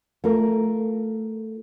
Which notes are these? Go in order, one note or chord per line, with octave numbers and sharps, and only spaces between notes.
A3 F4 A#4